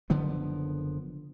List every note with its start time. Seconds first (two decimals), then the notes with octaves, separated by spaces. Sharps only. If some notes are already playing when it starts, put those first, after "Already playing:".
0.10 F#1 D3 F3 B3